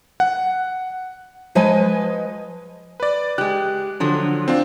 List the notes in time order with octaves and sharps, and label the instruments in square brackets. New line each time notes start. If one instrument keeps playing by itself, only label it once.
[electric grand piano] F#5
[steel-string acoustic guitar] F3 G#3 B4 D#5 G#5
[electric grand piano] B4 D5
[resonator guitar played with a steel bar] G#3 G4 [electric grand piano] F#6
[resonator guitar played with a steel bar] D3 F3 F#3
[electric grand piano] C4 D4 F4